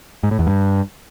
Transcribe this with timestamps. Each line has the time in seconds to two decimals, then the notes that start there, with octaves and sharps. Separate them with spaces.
0.23 G#2
0.31 A2
0.39 E2
0.47 G2